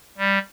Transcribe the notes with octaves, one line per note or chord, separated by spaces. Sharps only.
G3